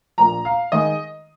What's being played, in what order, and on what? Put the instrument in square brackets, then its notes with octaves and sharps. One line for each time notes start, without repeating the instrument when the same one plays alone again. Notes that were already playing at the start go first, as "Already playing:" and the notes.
[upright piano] A#1 A#2 A#3 A#5
F5
D#3 G#3 D#5